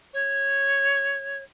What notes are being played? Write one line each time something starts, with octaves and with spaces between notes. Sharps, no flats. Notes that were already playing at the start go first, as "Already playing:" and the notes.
C#5